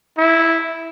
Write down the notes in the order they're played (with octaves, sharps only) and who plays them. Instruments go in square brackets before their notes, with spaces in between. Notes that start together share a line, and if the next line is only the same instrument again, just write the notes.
[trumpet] E4